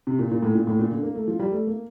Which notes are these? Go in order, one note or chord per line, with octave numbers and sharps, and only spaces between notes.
C3
A#2
A#2
A2
A#2
A2
A#2
D3
A#3
A3
F3
G3
A3
A#3